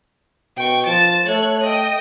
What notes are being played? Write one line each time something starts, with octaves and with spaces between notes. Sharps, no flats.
B2 G5 C#6
F3 A6 E7
A3 C#5 F#6
D#5 G5